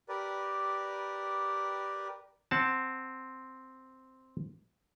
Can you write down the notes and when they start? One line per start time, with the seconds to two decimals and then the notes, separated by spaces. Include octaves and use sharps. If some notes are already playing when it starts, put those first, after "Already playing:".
0.09 G4 A#4 B4 D5
2.51 C4 F#5 A5